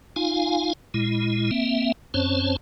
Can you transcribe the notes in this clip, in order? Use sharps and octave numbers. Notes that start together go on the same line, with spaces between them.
D#4 F4 F5 G#5
A#2 G#3 E4
A#3 C4 E5
F#2 C4 C#4 C5 C#5 A5